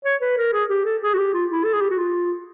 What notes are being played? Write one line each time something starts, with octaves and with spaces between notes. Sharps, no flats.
C#5
B4
A#4
G#4
G4
A4
G#4
F#4
G4
F4
E4
A4
G#4
G4
F#4
F4